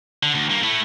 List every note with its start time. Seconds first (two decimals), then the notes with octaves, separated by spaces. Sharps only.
0.23 D3
0.35 D2
0.49 G2 A#3
0.64 A3 E4